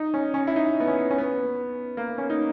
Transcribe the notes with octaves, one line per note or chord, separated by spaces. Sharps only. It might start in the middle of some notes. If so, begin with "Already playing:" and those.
Already playing: D#4
C#4
C#4
E4
D#4
B3
C#4
C#4
B3
A#3
C#4
D#4